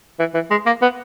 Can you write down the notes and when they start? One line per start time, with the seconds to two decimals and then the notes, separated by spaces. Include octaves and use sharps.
0.19 E3
0.34 E3
0.50 G#3
0.66 A#3
0.82 B3